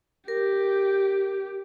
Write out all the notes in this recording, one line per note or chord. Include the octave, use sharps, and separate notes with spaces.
G4 A#4